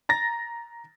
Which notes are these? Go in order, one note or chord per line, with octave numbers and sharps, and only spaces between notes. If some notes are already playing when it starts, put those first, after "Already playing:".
A#5 A6 A#6